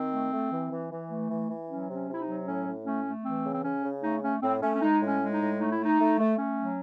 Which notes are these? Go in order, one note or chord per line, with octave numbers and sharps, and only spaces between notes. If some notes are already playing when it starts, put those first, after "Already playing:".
Already playing: D#3 C4
A3
A3
E3
E3
E3
A3
E3
E3
F#3 C#4
C3
C#4
C3
E4
D#4
F#3
A2 C#4
A2
A3 C#4
A3
E3 C4
C#3
C4
C#3 C#4
C#3
A3 D#4
A3 C#4
A2 C4
A3 C#4
C#4
G#3 D#4
A2
C#4
G#3
D#4
A2
A3 D#4
E4
A3
D#4
A3
A3
A3 C#4
F#3